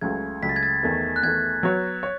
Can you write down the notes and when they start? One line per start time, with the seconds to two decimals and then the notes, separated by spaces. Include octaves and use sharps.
0.01 C#2 C#3 F#3 A3 G#6
0.42 C#2 C#3 F#3 A3 B6
0.49 A6
0.56 G#6
0.63 A6
0.83 E2 D#3 A3
1.16 F#6
1.23 E2 D#3 A3 G#6
1.63 F#3 B3 F#4 C#5
2.03 C#5